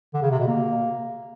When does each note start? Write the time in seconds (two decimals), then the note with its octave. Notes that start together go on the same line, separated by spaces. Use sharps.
0.14 D3
0.22 C#3
0.31 C3
0.39 B2
0.48 A#3